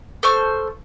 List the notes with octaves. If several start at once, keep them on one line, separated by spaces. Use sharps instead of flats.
A4 C5 C#6 F6